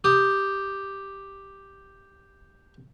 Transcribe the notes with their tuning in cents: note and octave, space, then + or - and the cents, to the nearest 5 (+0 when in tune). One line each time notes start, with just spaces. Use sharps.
G4 +0 D#6 +0